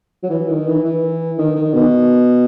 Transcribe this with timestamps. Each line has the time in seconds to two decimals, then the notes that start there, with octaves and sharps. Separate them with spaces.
0.23 F#3
0.30 E3
0.49 D#3
0.67 E3
0.84 E3
1.38 D#3
1.55 D#3
1.74 B2